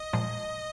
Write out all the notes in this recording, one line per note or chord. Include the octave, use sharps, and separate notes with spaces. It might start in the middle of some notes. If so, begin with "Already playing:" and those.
Already playing: D#5
A#2 F3 G#3